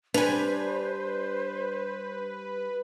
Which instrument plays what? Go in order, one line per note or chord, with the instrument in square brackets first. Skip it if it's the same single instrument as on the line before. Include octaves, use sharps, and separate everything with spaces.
[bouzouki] G3 G#5 [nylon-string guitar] D4 [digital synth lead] B4 [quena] C5